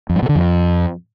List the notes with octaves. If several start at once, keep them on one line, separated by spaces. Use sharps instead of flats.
F2
G2
B2
D3
F2